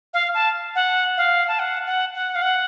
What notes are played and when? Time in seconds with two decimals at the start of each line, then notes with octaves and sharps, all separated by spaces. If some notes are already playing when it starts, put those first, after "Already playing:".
0.14 F5
0.34 A5
0.75 F#5
1.17 F5
1.48 A5
1.59 F#5
1.86 F#5
2.14 F#5
2.35 F5
2.42 F#5